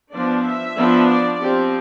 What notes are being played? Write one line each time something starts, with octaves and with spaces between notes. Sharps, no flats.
F3 B3 D4 D5
E5
F3 B3 D4
D5
F3 C4 G4